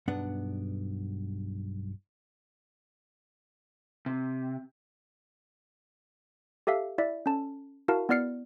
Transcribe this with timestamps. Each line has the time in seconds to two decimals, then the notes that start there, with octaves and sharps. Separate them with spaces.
0.08 B1 G2 B3 D4 F#5
4.06 C3
6.67 G4 A4 E5 F5
6.98 E4 D5 E5
7.26 C#4 A4 A5
7.88 E4 F#4 A#4 F5 A5
8.09 B3 E4 D5 F6 C7 C#7